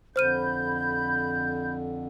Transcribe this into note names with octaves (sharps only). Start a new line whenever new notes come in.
F2 D3 C5 B5 F6 G6 D#7